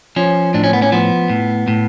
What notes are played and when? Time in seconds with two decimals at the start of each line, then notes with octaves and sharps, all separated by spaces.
0.16 F3 C#4
0.54 A2 D4
0.64 C#4
0.73 B3
0.82 C#4
0.92 F3 B3
1.30 A2
1.68 A2